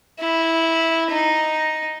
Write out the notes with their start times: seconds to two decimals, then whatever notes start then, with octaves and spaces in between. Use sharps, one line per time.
0.20 E4
1.11 D#4